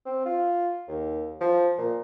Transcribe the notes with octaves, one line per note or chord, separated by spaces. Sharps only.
C4
F4
D#2
F3
A#2